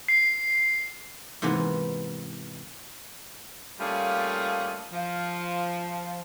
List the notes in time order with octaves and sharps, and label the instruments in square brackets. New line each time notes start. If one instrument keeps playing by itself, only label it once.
[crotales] C7
[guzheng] G#2 C3 E3 A#3 B3 F4
[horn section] G3 A3 A#3 C#4 F4 G#4
F3